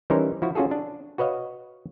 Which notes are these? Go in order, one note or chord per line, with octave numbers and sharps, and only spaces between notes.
E3 G3 C#4 D#4 A#4 C5
F3 E4 F#4
C#4 F4 F#4 G#4 A4
D4
F#4 B4 C#5 D#5 F5